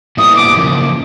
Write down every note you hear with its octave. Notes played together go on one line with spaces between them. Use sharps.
A#2 G3 B3 E4 D#6
D6
E2 C#3 F3 A#3